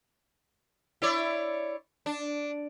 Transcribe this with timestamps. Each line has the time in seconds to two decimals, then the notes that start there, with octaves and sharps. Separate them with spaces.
1.02 E4 C#5 D5
2.06 D4